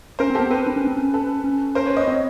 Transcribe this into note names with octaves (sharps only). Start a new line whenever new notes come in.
C#4 A#4 C5
C4
G4 A4
B3
C4 A4 B4
D4
C#4
C4
C#4
A4 B4
C#4
A#4 C5
B4 C#5
C#5 D#5
C4